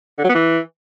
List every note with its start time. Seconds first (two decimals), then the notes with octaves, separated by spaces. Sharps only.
0.19 D3
0.24 F#3
0.29 B3
0.35 E3